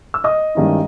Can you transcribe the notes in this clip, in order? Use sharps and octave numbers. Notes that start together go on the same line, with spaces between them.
E6
D#5 D#6
G2 D#3 G#3 C#4 E4